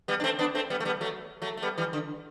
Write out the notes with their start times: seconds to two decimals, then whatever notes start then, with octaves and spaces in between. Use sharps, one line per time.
0.08 G3 B3
0.20 D4
0.24 A3 C4
0.39 B3 D4
0.55 A3 C4
0.70 G3 B3
0.80 A3
0.85 G3 B3
1.01 F#3 A3
1.42 F#3 A3
1.57 A3
1.62 G3 B3
1.78 E3 G3
1.93 D3